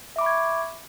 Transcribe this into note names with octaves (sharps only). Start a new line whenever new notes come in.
E5 B5 C#6 D6 G#6